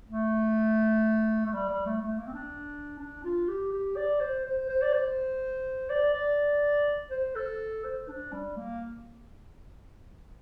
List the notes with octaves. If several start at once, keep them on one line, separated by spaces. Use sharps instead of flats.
A3
A3
G3
G3
A3
A3
A#3
C4
D4
D4
F4
G4
G4
D5
C5
C5
C5
D5
C5
D5
D5
C5
A4
C5
D4
G3
A#3